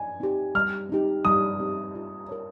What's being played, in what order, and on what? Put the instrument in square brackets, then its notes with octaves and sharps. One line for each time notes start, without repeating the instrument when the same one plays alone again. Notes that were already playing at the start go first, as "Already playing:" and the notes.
Already playing: [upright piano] G#5
[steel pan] C4 D#4 G4
[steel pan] G3 [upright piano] F6
[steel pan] C4 D#4 G4
[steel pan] G3 [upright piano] D#6
[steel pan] C4 D#4 G4
F4
A#4 C#5